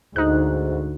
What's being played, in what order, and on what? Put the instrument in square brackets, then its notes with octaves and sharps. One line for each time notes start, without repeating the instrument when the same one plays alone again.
[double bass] D2 [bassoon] G#2 [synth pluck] D#4 F#6